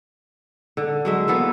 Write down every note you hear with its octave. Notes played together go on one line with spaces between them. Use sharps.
D3
F#3 G#3 E5
E3 A#3 B3 A4